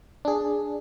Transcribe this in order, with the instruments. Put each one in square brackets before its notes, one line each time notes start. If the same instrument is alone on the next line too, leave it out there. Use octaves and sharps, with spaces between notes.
[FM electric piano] D4 G#4